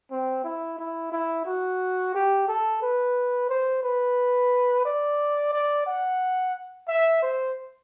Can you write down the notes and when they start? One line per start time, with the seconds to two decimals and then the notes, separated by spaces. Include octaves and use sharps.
0.11 C4
0.44 E4
0.78 E4
1.12 E4
1.46 F#4
2.15 G4
2.48 A4
2.82 B4
3.49 C5
3.83 B4
4.85 D5
5.53 D5
5.86 F#5
6.88 E5
7.22 C5